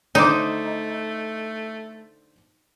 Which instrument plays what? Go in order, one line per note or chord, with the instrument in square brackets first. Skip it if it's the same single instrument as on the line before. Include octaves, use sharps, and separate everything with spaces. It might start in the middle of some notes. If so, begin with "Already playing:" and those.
[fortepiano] D3 C5 D6 [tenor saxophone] A3 [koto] D#4